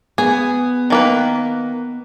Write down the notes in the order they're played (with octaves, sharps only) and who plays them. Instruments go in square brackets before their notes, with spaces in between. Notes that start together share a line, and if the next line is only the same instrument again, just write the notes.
[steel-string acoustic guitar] B3 [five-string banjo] G#4
[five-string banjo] D#3 A#3 B4